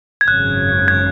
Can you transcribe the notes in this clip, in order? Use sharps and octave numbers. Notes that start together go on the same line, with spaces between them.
G#6
G#1 F#2 C#3 F#6
G#6